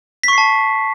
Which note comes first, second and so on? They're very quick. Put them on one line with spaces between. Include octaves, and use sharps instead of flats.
B6 C#6 C7 A5